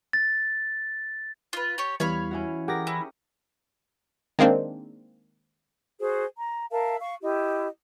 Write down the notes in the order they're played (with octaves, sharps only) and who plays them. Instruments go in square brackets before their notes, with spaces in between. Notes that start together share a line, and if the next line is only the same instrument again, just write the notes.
[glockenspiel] A6
[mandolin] F4 B4
G4 C#5
[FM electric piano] E2 G3 [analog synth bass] E3 [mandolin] C#5 F5 B5
[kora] C#4 E4 F#4
[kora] G4 G#4 A#4 [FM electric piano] F#5 D6 A#6
[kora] C#4 [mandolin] E4
[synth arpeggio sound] D#3 G#3 A#3 C4 D4
[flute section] F#4 G#4 C5
A#5
A#4 E5 F5 A5
F5 C#6
E4 G4 D#5